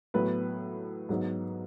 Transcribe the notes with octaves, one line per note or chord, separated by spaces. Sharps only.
A2 F#3 B3 B4
G#2 F#3 B3